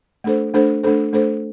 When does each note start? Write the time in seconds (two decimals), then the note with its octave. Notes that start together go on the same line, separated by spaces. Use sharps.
0.24 A3 D4 A4 C5
0.54 A3 D4 A4 C5
0.83 A3 D4 A4 C5
1.13 A3 D4 A4 C5